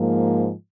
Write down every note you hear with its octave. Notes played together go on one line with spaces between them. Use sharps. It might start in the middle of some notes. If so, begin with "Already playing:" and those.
Already playing: G#2 F3 A#3